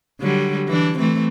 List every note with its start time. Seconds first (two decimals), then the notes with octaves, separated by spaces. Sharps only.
0.21 D3 F#3 G3
0.68 E3 D4
0.98 E3 A3 C4